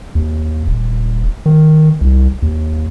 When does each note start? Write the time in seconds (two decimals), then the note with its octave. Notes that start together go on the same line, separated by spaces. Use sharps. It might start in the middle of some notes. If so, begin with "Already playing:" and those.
0.15 D#2
0.67 D#1
1.46 D#3
2.01 C2
2.42 D#2